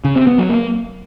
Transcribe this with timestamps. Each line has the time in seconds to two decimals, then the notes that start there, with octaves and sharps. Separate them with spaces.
0.05 C#3
0.16 C4
0.27 B3
0.38 F#3
0.49 A#3